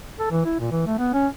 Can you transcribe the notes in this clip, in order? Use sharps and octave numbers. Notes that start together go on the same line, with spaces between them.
A4
E3
E4
A#2
E3
A3
B3
C#4